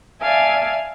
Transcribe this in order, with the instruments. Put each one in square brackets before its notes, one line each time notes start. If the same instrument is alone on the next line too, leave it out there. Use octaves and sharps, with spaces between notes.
[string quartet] D5 E5 F5 G#5 A5